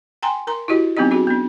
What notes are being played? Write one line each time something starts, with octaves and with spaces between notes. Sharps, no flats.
G5 G#5 A#5 C6
A#4 A#5 C6
E4 F#4 G4 D#5
F#3 B3 C4 D#4 G4 D#5
D4 F#4 G#4
B3 D4